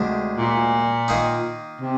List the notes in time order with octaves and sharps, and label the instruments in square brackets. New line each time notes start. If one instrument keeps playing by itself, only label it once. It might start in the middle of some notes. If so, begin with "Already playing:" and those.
Already playing: [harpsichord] D2 C3 D#3 G#3 D4
[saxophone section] A#2
[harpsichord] D#3 A#3 D#4
[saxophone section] C3